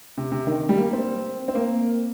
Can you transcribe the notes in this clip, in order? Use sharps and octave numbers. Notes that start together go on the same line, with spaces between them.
C3
C3
D#3
G3
A#3
C4
C4
A#3